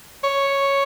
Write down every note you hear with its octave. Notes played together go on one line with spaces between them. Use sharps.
C#5